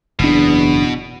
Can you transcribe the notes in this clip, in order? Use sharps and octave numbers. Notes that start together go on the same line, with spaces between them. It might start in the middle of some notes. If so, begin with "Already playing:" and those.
F#1 E2 B2 D4